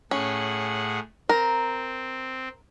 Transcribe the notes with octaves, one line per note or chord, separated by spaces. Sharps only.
A2 C#4 G#4 F#5
C4 A#4